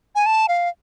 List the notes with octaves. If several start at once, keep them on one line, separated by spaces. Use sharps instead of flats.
G#5
A5
F5